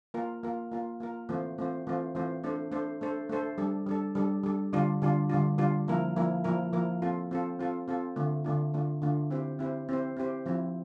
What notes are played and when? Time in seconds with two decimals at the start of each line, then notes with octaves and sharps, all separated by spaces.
0.14 A#3 F4 A#4
0.43 A#3 F4 A#4
0.72 A#3 F4 A#4
1.00 A#3 F4 A#4
1.29 E3 A3 C4 F4 C5
1.58 E3 A3 C4 F4 C5
1.87 E3 A3 C4 F4 C5
2.15 E3 A3 C4 F4 C5
2.44 A3 D4 A4 C5
2.72 A3 D4 A4 C5
3.01 A3 D4 A4 C5
3.29 A3 D4 A4 C5
3.58 G3 D4 A4
3.86 G3 D4 A4
4.15 G3 D4 A4
4.43 G3 D4 A4
4.73 D3 G3 D4 F4
5.02 D3 G3 D4 F4
5.30 D3 G3 D4 F4
5.58 D3 G3 D4 F4
5.88 F3 A#3 E4 A#4
6.16 F3 A#3 E4 A#4
6.44 F3 A#3 E4 A#4
6.73 F3 A#3 E4 A#4
7.02 C4 F4 A4
7.31 C4 F4 A4
7.59 C4 F4 A4
7.88 C4 F4 A4
8.16 D3 A3 D4 F4
8.44 D3 A3 D4 F4
8.74 D3 A3 D4 F4
9.02 D3 A3 D4 F4
9.30 C4 E4 G4 C5
9.59 C4 E4 G4 C5
9.89 C4 E4 G4 C5
10.17 C4 E4 G4 C5
10.46 F3 C4 E4